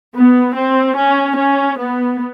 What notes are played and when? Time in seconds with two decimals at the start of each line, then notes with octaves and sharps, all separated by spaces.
0.15 B3
0.56 C4
0.96 C#4
1.38 C#4
1.78 B3